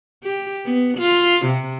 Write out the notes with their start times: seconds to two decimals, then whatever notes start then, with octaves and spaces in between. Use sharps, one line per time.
0.23 G4
0.65 B3
0.97 F4
1.45 C3